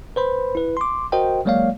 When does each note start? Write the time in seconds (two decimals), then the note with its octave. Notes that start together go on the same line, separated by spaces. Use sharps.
0.16 B4 C5 B5
0.55 E4 B4
0.77 C6 D6
1.12 F#4 A#4 C5 D#5 G5
1.45 F#3 G#3 A#3 C#5 D5 F5